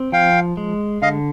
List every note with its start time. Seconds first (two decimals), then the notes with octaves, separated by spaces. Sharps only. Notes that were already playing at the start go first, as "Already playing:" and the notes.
Already playing: C4
0.12 F3 F5 G5
0.57 G#3
1.02 D3 D#5 F5